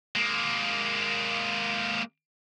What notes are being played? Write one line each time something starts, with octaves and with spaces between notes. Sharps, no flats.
G#3 A#3